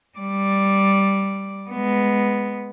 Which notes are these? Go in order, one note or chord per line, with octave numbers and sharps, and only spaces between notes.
G3 D5
G#3 B3